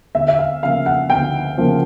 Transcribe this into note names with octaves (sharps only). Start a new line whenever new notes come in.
D2 E5
E5
F5
C#3 F3 A#3 F5
F#5
D2 G5
C#3 F3 A#3